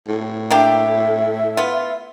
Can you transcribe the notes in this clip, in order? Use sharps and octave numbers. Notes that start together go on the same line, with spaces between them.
A2
A#3 D4 G4 E5
B3 F4